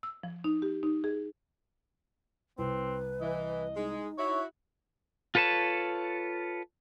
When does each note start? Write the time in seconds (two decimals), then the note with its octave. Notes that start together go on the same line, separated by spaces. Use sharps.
0.03 E6
0.23 F3
0.44 D#4
0.62 G4
0.83 D#4
1.04 G#4
2.58 C2 C4 B4
3.21 E3 D#5
3.76 G#3 D#4
4.18 E4 F#4 C#5
5.35 F4 A4 B4 C#5 A5